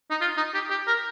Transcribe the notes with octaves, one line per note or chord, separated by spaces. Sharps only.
D#4
F4
D#4
G4
G4
A#4